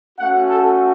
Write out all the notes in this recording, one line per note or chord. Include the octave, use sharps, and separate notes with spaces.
A3 C#4 F#4 F#5
A4